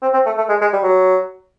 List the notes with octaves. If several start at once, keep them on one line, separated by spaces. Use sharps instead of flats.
C4
C4
A3
A3
G#3
G#3
G3
F#3